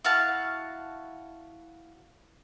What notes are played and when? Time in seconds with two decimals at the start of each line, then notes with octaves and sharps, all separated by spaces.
0.05 E4 F#4 F5 A5